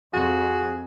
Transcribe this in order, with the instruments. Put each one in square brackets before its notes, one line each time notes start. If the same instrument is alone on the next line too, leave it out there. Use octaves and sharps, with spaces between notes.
[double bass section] F2 [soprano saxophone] F#4 [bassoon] G#4